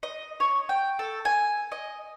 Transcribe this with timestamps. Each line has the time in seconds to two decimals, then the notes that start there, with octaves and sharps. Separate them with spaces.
0.03 D#5
0.40 C#5
0.69 G5
0.99 A4
1.25 G#5
1.72 D#5